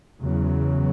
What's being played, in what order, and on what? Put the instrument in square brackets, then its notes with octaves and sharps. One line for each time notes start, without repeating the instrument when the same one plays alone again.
[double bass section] E2 C#3 F#3